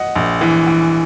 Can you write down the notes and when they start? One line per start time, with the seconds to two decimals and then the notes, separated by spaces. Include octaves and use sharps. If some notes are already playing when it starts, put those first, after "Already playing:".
Already playing: D#5 F#5
0.16 A#1
0.41 E3
0.67 E3